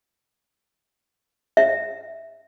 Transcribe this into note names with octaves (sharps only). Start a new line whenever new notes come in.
E5